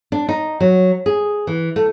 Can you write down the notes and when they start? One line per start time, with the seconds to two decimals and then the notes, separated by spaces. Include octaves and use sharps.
0.12 D4
0.29 D#4
0.60 F#3
1.06 G#4
1.47 E3
1.76 A3